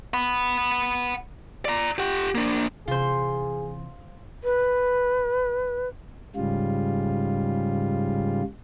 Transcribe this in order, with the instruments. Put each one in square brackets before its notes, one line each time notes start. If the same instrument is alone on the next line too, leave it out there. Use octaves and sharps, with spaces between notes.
[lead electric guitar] F#5 B5
D5 A#5
G4 F#5
A#3 D4
[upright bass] C3 E3 [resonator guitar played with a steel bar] F4 C5 [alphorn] G#4
[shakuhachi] B4
[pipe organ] G#2 C#3 G3 F4